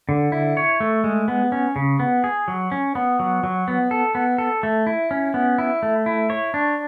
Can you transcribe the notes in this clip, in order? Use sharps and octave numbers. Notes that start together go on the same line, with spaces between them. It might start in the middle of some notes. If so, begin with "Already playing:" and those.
D3
E4
C#5
A3
G#3
B3
C#4
C#3
B3
G#4
F#3
C#4
B3
F#3
F#3
B3
A4
B3
A4
A3
E4
C#4
B3
E4
A3
E4
C#5
D4